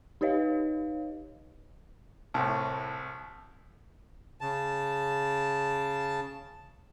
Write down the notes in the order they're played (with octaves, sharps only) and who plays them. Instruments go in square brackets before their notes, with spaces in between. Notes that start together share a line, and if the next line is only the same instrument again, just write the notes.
[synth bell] D#4 G4 B4 C#5 D#5 F5
[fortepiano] C2 A2 [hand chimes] A5
[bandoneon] C#3 A5